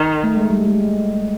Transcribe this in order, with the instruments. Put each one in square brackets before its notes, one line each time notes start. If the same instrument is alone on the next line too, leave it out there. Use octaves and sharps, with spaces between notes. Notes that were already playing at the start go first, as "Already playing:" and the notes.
Already playing: [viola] D#3
[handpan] A3
G#3
G3
G#3